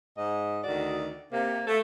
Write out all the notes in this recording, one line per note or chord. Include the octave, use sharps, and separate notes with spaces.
G#2 D#5
D2 D#3 F#4 D5
C3 A#3
A3